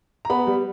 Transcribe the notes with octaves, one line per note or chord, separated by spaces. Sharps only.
A#5
B3 B5
G3